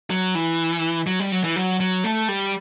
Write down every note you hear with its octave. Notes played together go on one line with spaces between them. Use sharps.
F#3
E3
F#3
G3
F#3
E3
F#3
F#3
A3
G3